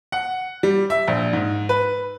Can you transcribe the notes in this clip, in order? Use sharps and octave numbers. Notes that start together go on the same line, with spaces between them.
F#5
G3
E5
A#1
G#2
B4